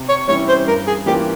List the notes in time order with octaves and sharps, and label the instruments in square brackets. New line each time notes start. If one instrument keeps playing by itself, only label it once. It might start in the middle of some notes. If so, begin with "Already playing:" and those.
Already playing: [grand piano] C3
[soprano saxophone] C#5
[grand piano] E3 G3 C#4 E4 [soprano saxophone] C#5
[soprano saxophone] C5
[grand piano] G2 [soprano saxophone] A#4
[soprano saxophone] G#4
[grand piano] E3 A#3 C#4 F4 [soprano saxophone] G4